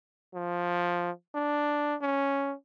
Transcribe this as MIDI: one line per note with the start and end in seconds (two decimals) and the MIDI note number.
0.34 1.11 53
1.35 1.95 62
2.02 2.54 61